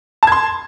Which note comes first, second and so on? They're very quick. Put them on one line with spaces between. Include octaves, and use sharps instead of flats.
A5 G#6 C6